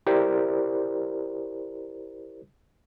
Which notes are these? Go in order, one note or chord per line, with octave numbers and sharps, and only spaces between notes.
E4 G4 A#4 C5 D5